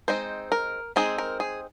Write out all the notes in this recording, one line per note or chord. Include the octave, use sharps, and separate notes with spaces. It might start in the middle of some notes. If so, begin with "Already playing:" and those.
G#3 C4 D#4 C5
A#4
G#3 C4 D#4 G#4
A#4
G#4